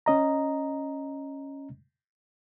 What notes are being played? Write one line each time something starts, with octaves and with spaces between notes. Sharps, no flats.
C#4 D#5 A#5